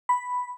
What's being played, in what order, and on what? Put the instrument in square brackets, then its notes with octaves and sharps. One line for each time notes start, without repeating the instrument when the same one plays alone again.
[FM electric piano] B5